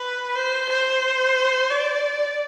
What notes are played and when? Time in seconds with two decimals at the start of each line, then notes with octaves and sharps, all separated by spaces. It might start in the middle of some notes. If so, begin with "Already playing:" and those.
Already playing: B4
0.36 C5
0.69 C5
1.70 D5